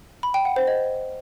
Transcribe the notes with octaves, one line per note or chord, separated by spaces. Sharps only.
B5
G5
F#5
C5
D#5